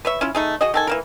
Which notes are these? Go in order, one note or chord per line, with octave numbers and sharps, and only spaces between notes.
B4 C#5 E5
C#4 E4 F4
A3 D#4 G#4
F#4 G#4 D#5
D#3 A4 G#5
E3 A#3 A#4